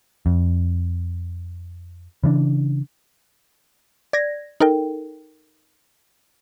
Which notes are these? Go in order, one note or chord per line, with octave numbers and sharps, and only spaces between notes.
F2
C#3 E3 D4
D5 G#6 A#6
D#4 A4 A#4 G5